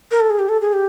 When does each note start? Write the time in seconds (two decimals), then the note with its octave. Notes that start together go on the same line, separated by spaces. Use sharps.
0.11 A#4
0.20 A4
0.30 G#4
0.39 G4
0.49 A4
0.61 G#4
0.73 G4